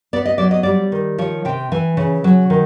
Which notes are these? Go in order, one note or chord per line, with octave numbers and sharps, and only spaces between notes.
B3 D5
D#5
F#3 D5
D#5
G3 D5
D#3
F3 C#5
C3 G5
E3 G#5
C#3
F#3
D#3